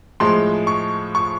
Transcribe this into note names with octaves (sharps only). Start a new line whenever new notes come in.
A2 F3 G#3 C6
C#6
C#6